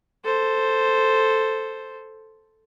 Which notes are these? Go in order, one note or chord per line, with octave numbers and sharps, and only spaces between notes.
A4 C5